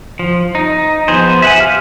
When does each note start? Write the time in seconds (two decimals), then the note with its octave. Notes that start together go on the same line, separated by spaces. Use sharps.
0.19 F3
0.55 D#4
1.08 F3 B3 G#4 C5
1.42 E5 F#5 G#5
1.58 G4 F5 F6